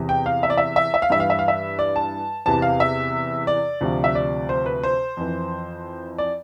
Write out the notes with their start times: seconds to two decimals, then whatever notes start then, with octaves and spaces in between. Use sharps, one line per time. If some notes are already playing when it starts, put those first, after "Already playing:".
Already playing: E2 C3 E3
0.09 G5
0.26 F5
0.43 E5
0.50 D5
0.57 E5
0.76 E5
0.94 E5
1.02 F5
1.10 G2 E3 E5
1.20 F5
1.30 E5
1.39 F5
1.48 E5
1.79 D5
1.96 A5
2.46 E2 C3 E3 A5
2.62 F5
2.80 E5
3.47 D5
3.81 D2 C3 F3
4.04 E5
4.15 D5
4.49 C5
4.66 B4
4.83 C5
5.17 F2 E3
6.18 D5